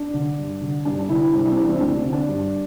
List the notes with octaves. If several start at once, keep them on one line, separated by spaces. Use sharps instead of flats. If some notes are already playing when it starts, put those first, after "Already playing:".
Already playing: D4
D3
G2
D3
G2 D4
D4
D3 E4
C2 D4
E4
C4
C3 E3 D4
C4
E4
D2 D4
C4
D3
D4
G2